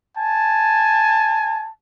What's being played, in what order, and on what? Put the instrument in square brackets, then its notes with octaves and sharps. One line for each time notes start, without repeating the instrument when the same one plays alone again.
[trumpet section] G#5 A5